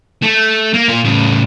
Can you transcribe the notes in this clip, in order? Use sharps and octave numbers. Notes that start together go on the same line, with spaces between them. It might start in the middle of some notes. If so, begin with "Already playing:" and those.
A3
A#3
A#2 F4
A2 C#3